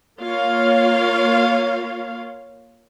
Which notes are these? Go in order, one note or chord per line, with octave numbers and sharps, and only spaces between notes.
A#3 F4 C#5 F5